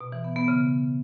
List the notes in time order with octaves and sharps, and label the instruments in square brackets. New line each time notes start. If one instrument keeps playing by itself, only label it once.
[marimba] B2
E3
B3
B3
C#3